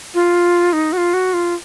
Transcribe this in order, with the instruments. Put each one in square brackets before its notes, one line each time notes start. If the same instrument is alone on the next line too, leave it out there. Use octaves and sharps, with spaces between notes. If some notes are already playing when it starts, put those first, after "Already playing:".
[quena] F4
D#4
F#4
F4
F#4
F4